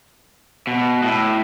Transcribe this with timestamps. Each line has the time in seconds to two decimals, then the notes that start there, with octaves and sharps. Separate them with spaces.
0.67 B2
1.03 A2